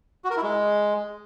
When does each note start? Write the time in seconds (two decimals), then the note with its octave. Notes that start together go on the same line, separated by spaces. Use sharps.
0.24 F#4
0.30 A#4
0.37 E4
0.43 G#3